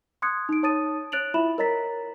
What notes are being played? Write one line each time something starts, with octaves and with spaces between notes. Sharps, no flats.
C6 D#6 F#6 G#6 C#7
D#4 D7
D#4 C#5 A5 D#6 A6 D#7
C#5 F#6 A6 D7 F7 F#7
E4 F4 E5 B5 E7 F#7
A#4 C#5 D#5 A#5 A6 B6